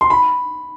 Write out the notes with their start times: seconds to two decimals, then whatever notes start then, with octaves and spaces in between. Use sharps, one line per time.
0.01 C6
0.10 B5